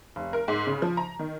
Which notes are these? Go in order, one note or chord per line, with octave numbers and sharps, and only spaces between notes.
F1
A#4
G#2
C#3
F3
A#5
D#3